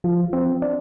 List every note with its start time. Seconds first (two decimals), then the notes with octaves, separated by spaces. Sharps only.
0.04 F3
0.33 C4
0.62 D4